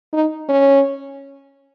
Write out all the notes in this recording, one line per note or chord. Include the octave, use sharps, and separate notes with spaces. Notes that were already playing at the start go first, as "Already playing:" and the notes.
D#4
C#4